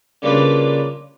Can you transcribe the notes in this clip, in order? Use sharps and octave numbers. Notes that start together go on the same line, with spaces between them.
C#3 G3 A#3 D4 F4 B4